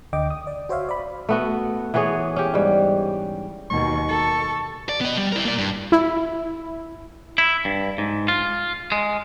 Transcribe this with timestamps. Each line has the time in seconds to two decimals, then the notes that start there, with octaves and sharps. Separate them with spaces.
0.13 D2 D3 D#5 G5 D6
0.30 D#6
0.47 D5
0.69 F#4 C5 C#5 E5 F5
0.89 D5 B5
1.29 A3 B3 F#4
1.94 E3 B3 G#4 C#5
2.36 C#4 G4
2.54 G#2 G3
3.70 D#2 B2 C#6
4.09 A4
4.89 D5
5.01 B3 D#5
5.17 G3
5.32 E4 A#4
5.45 A#3 D5
5.58 G2
5.92 E4
7.38 E4
7.65 G2
7.98 G#2
8.28 F4
8.92 G#3